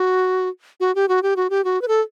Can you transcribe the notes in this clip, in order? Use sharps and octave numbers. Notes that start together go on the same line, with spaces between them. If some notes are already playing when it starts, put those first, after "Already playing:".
Already playing: F#4
F#4
G4
F#4
G4
F#4
G4
F#4
B4
A4